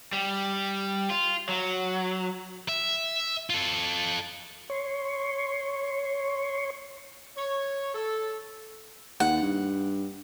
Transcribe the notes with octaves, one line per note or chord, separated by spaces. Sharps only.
G3
F4
F#3
E5
F4 A4
C#5 C6 C#6
C#5
A4
D#2 F#5
G2